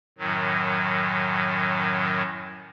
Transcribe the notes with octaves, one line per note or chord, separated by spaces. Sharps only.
F#2 A2 D#3 F#3